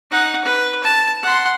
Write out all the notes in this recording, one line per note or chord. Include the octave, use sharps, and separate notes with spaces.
D#4 F#5
B4
A5
F#5 C6